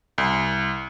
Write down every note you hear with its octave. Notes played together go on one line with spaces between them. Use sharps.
C2